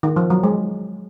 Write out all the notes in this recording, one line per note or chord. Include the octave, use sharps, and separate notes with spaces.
D#3
F3
F#3
G#3